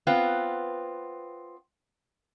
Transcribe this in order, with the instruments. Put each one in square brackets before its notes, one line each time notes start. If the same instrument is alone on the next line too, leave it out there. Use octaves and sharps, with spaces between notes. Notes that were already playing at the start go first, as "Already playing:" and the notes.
[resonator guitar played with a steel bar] B3 C4 F4 B4